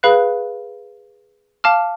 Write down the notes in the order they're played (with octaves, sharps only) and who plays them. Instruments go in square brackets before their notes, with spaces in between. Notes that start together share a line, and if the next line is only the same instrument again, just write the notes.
[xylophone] G#4 B4 F5 B5 F#6
F5 A5 D6 F6